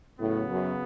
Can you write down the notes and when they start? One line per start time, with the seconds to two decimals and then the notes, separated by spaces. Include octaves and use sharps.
0.19 A2 C#3 F#3 B3
0.49 F#2